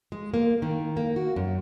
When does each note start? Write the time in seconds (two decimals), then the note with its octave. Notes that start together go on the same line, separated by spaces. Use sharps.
0.12 G#3
0.34 A#3
0.62 D#3
0.97 A#3
1.16 F#4
1.36 F#2